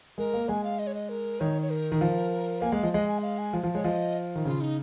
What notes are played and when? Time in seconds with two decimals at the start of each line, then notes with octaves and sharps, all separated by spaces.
0.18 G#3 A#4
0.33 A#3
0.49 G#3 G#5
0.64 F5
0.79 D#5
0.87 C#5
0.95 D#5
1.09 A#4
1.40 D#3 C#5
1.62 C#5
1.70 A#4
1.92 D#3
2.01 F3
2.62 A#3 G#5
2.72 G#3 F5
2.83 F3 D#5
2.93 G#3 D#5
3.08 G#5
3.19 D#5
3.23 F5
3.38 G#5
3.53 F3
3.63 F3
3.75 G#3 C#5
3.84 F3 D#5
4.35 D#3
4.45 C#3 F4
4.61 D#4